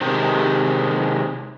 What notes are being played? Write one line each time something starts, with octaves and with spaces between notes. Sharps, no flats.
C3 D#3 G#3 G4